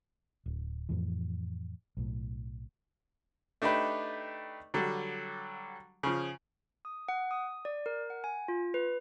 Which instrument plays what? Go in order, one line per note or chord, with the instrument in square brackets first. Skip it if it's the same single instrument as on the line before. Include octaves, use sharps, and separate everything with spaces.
[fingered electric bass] D1
F2 A2 E3
B1 A2
[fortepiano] A3 D4 D#4 G4 B4
D3 F#3 G3
C#3 F3
[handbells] D#6
F#5
D#6
D5
A#4
F#5
G#5
F4
B4